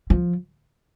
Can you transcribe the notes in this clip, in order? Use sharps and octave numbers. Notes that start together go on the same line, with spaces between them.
F3